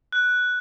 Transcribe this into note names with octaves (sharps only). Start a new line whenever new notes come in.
F#6